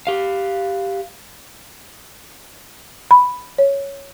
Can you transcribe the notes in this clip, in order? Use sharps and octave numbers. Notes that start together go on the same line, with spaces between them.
G4 F5
B5
C#5